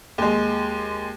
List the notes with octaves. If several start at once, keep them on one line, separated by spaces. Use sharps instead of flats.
D#2 G#3